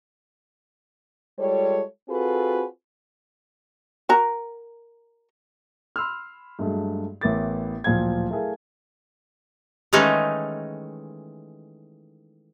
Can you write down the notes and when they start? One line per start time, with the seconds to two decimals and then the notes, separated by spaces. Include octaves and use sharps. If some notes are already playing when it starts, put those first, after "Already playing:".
1.39 G3 G#3 F4 A4 C#5
2.09 C4 F4 F#4 G#4 A4 B4
4.09 F#4 A#4 A#5
5.96 B5 C6 E6 F6
6.59 G2 F#3 G#3 A3
7.21 A1 B3 E4 A#4 D6 A6
7.84 D1 A#2 F3 F5 G5 G#6
8.31 A3 E4 G#4 A#4 F5
9.93 D#3 E3 G#3 A3 C#4 D#4